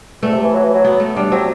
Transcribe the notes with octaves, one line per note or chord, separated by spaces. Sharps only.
E2 A3
C3
E3
F#3
E3
F#3
B3
A3
G3 D4
F#3 C4